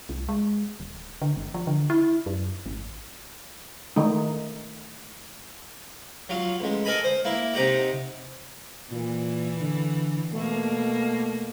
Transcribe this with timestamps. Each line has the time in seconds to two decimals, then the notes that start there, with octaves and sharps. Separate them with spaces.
0.09 C2
0.29 G#3
0.80 D1
1.22 D3
1.36 G1
1.54 F3
1.67 D3
1.90 E4
2.26 F#2
2.66 G#1
3.96 D#3 A3 D#4
6.29 F#3 F4
6.60 A1 G#3
6.85 A4 A#4 D#5 G#5 A#5 B5
7.04 C5
7.25 A#3 E4
7.53 C3 D#4 G4 F#5 A#5
8.91 A#2 E3
9.60 D3
10.33 B2 A3 A#3